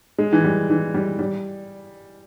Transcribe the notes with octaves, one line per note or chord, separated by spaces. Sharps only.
G#3
E3
G3
E3
G3
G3